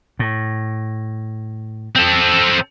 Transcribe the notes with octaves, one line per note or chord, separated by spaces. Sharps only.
A2
C4 A4